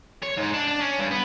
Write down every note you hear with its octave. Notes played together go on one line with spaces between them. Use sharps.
C#5
G#2
D4
D4
C#4
G2
B3